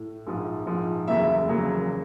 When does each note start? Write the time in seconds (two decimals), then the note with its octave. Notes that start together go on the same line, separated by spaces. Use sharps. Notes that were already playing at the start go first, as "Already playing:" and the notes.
Already playing: A2
0.27 A#1 G#2 F3
0.66 A#1 G#2 F3
1.08 F1 E2 C#3 F#3 A#3 E5
1.49 F1 E2 C#3 F#3 A#3